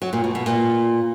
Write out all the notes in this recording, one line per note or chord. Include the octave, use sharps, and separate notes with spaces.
F#3
A#2
B2
B2
A#2